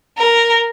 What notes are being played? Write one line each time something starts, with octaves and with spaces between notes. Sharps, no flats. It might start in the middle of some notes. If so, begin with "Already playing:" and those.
A#4